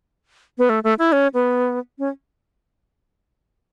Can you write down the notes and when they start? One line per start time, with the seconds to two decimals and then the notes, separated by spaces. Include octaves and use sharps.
0.58 B3
0.69 A3
0.84 A3
0.99 E4
1.12 C#4
1.34 B3
1.99 C#4